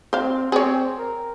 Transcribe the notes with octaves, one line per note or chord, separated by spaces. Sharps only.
C4 C5 F5
C4 G#4 C#5
A#4